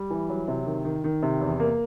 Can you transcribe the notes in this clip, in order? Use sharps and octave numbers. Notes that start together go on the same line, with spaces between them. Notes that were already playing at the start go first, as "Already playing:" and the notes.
Already playing: G3
E3
F#3
C3
D#3
D#3
D#3
C3
E2
A#3